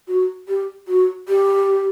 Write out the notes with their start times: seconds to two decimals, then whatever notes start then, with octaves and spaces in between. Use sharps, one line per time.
0.08 F#4
0.48 G4
0.88 F#4
1.28 G4